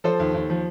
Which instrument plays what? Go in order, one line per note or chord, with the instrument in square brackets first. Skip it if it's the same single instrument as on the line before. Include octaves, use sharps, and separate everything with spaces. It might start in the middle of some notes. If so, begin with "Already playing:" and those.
[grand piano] F3 A4 C5
D#2
D#2
F3